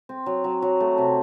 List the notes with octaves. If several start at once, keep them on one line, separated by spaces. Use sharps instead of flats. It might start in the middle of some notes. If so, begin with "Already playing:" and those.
C4
F#3
F#3
F#3
A3
C3